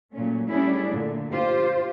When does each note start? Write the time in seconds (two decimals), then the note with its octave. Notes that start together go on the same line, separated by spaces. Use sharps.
0.12 A#2 F#3 A3 C#4
0.49 G3 A3 C#4 D4 E4 G#4
0.91 A#2 D3 A3
1.31 F4 G4 C5